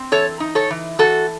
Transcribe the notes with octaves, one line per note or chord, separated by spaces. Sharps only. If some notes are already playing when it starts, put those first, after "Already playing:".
Already playing: C4
E3 A4 C#5
D#4
A4 C#5
E3
E3 F#4 A4